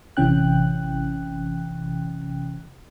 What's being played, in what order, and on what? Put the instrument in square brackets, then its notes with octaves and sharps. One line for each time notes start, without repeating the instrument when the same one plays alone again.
[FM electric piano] A1 C3 E3 C#4 G5 F#6